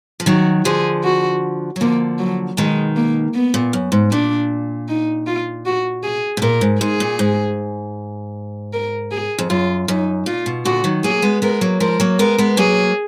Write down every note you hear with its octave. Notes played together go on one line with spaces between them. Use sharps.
F3
D#3 F#3 F#4
D3 F3 G#4
F#4
F#3
D3 F3 A#3
F#3
B2 D#3 G#3
A#3
B3
A#2
F#2
G#2
A#2 D4
D#4
F4
F#4
G#4
B2
A#2 A#4
G#2
G#2 G#4
A#2
G#2
A#4
G#4
F2
F#2 F4
F#2 D#4
A#2 F4
B2
A#2 D3 F#4
D#3 F#3
F#3 A#3 G#4
G#3 B3
G#3 B3 A#4
F#3 A#3
F3 G#3 A#4
F#3 A#3
G#3 B3 A#4
G#3 B3
F#3 A#3 G#4